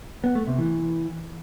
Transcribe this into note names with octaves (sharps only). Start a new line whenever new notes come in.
B3
A3
C3
E3